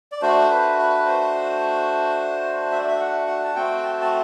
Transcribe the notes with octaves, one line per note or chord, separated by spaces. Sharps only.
D5
A3 D4 F#4 C5
B4
B4
C5
E5
D5
E5
F#5
F#5
A5
A3 C4 F#4 G5
A5
A5